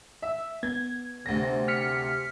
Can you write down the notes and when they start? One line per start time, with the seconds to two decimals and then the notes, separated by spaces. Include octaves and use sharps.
0.22 E5
0.63 B3 G#6
1.26 D2 C3 A#6
1.68 F6 B6 C#7